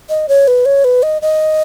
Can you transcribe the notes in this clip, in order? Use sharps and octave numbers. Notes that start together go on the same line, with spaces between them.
D#5
C#5
B4
C#5
B4
D#5
D#5